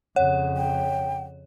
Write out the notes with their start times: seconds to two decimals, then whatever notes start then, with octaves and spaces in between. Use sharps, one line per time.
0.16 F2 C#3 C#5 F#5
0.57 G5